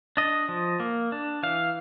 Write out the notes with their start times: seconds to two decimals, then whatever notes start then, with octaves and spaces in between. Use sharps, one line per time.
0.17 D4 D#5
0.49 F3
0.80 A#3
1.12 D4
1.43 E3 F5